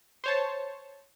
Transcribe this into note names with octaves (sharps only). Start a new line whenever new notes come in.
C5 C#5 A5